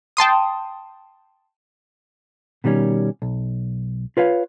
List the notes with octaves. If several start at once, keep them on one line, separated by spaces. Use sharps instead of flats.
G5 A5 C6 D#6
B2 D#3 G3 B3 C#4
B1
F4 B4 C#5 F5